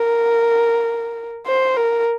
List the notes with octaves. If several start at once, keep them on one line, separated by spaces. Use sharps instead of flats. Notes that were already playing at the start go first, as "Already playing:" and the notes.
Already playing: A#4
C5
A#4